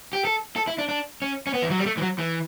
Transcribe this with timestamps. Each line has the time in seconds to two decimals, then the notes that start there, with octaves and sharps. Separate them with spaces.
0.13 G4
0.25 A4
0.56 A4
0.67 E4
0.78 D4
0.89 D4
1.22 C#4
1.47 C#4
1.54 B3
1.63 E3
1.70 F#3
1.78 G3
1.86 A3
1.97 E3
2.02 F#3
2.19 E3